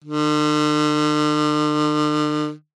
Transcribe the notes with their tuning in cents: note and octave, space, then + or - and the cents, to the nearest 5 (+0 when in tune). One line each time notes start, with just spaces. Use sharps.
D3 +45